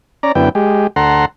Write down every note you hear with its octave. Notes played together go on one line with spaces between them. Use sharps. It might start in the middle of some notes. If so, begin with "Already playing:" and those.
C#4 D5 A#5
F#2 D3 B3 E4 G5
G#3 G4
D2 A4 F#5 A#5 C6